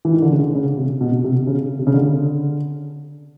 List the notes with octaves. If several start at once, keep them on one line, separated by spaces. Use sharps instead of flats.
E3
D#3
D3
C#3
C#3
C3
B2
C3
C#3
C3
C#3
D3